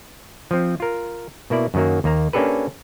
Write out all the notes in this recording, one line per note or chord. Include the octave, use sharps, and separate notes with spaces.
F3 C4
F4 A#4
B2 A#3 E4 D5
F#2 D#3 F#3 A#3
D#2 A#3 A#5
A#3 C#4 D4 G4 A4 B4